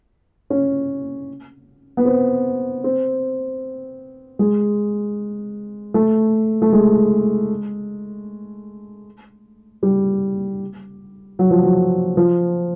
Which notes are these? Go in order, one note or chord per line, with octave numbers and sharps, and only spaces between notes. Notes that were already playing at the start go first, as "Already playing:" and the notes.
C#4
B3
C4
C4
G#3
A3
A3
G#3
G3
F#3
F3
F#3
F3